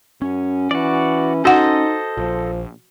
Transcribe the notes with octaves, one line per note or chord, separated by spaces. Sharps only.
F#2 C#4
E3 F#4 D5
D#4 F#4 A4 C5 D#5 F#5
A#1 F3